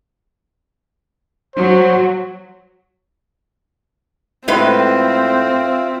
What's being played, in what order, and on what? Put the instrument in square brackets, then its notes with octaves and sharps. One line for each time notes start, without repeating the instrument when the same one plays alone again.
[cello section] F#3 [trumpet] C5
[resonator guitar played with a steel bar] A2 G#3 B4 [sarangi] C4 [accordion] F4 E5 F5